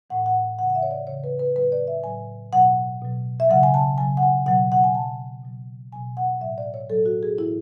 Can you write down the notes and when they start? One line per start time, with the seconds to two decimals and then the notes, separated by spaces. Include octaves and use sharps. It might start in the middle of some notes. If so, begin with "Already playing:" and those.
0.10 A2 E3 F#5
0.26 F#5
0.59 C#3 E3 F#5
0.70 F#5
0.75 E5
0.83 C#5
0.91 D5
1.07 C#3 E3 C#5
1.24 B4
1.39 B4
1.55 A2 F#3 B4
1.72 D5
1.87 E5
2.04 A2 F#3 G#5
2.53 B2 F#3 F#5
3.02 B2 F#3
3.40 E5
3.50 C#3 F#3 F#5
3.63 G#5
3.74 A5
3.98 C#3 F#3 G#5
4.17 F#5
4.23 G#5
4.46 B2 F#3 F#5
4.72 F#5
4.84 G#5
4.95 B2 F#3 A5
5.44 B2 F#3
5.93 B2 F#3 G#5
6.17 F#5
6.41 A2 F#3 E5
6.58 D5
6.74 C#5
6.90 A2 F#3 A4
7.06 F#4
7.23 G#4
7.38 A2 E3 E4